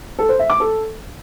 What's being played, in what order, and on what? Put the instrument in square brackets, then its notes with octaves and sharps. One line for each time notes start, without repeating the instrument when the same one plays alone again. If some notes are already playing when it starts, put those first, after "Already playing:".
[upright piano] A4
C5
E5
D6
A4